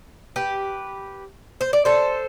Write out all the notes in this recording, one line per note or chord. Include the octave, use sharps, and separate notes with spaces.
G4 B4
C5
D5
A4 C5